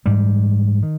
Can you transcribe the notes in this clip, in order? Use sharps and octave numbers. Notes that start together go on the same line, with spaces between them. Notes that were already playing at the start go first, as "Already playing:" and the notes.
G#2 E3 G3
D#3